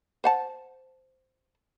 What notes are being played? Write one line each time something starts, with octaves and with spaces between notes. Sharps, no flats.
C5 F#5 A5